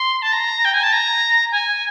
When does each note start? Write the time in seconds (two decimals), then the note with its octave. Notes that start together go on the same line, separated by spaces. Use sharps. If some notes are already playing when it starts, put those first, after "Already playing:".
Already playing: C6
0.22 A5
0.32 A#5
0.65 G5
0.74 G#5
0.83 A5
0.92 A#5
1.51 G#5